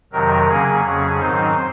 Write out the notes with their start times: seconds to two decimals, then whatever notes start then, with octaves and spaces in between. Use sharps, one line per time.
0.12 F2 C3 D#3 F#3 A#4
0.48 C#3 F#3 A#3 C#4 G#4
0.84 F2 C#3 F#3 C#4 G#4
1.20 G#2 D#3 F#3 C4 D#4 C5